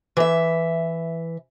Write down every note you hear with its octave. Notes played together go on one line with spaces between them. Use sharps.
E3 E5